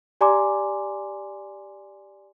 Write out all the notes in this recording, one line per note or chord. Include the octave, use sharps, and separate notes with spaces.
G4 D5 G#5 A#5 C6 D6